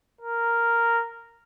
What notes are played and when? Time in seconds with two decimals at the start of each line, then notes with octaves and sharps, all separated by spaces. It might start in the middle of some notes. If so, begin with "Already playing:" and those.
0.21 A#4